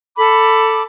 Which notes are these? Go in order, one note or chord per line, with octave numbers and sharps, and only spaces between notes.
A4 B5 D6